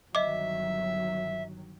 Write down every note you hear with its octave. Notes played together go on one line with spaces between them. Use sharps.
G1 D#3 F#3 D#5 E5 D6